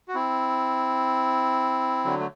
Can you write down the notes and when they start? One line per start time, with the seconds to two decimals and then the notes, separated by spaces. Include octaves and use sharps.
0.08 F#4
0.15 C4 E4
2.05 D3 F#3
2.19 A3